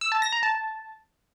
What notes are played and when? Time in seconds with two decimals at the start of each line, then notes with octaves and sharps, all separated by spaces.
0.01 E6
0.12 A5
0.22 A#6
0.32 A#5
0.43 A5